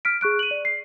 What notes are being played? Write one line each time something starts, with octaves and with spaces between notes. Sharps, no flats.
F6 B6 D7
G#4 C#6 F#6 D7
D#7 F#7
D5
C7